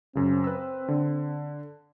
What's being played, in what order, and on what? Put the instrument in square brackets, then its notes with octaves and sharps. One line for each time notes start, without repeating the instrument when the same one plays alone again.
[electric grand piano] F#2 C#3 [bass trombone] C4
[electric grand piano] B4 E6
D3